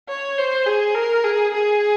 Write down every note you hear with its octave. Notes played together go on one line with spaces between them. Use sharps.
C#5
C5
G#4
A#4
G#4
G#4